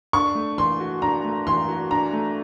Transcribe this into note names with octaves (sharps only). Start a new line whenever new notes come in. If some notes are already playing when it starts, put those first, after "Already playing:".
D4 C#6
A3
E3 C6
F#4
D4 A#5
A3
E3 C6
F#4
D4 A#5
A3